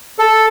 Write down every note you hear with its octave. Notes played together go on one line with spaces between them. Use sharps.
A4